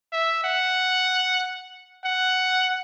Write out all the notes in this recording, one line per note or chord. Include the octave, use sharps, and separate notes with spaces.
E5
F#5
F#5